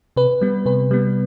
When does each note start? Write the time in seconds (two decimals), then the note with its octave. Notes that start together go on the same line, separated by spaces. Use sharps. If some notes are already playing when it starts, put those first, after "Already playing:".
0.16 C3 B4
0.41 G3 B3
0.66 C3 B4
0.91 G3 B3